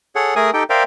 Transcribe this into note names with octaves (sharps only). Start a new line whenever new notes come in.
G#4 A4 C#5 F#5
A3 G#4 A#4 G#5 D#6
D#4 G4 A4 G5
A#4 C5 D5 E5 F5 G5